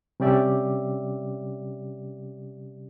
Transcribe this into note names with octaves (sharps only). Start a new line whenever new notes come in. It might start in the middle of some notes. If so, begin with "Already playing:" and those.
C3 G3 C#4 G4 D5 E5